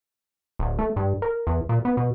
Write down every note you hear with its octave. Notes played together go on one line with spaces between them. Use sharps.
D1
A3
G2
A#4
E2
A#2
B3
B2